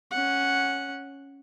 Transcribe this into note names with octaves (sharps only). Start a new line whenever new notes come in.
C#4 F#5